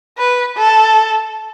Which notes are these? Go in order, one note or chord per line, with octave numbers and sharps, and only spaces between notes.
B4
A4